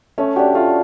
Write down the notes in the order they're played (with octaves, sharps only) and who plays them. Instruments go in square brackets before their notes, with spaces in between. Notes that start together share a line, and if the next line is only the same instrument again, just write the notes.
[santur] A3 [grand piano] C#4
[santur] D4 F#4 [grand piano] G4
[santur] A3 [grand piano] F4